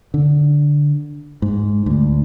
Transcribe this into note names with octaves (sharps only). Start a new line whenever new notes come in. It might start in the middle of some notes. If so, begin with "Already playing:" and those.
D3
G#2
D2